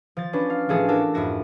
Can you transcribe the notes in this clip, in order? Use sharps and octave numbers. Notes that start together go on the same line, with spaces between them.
F3 A6
C#4 D4 B4
F5
A1 F3 G#4 A4 C#7
D4 F#4 A4 A#4
F2 G#2 E4 F#4 A#6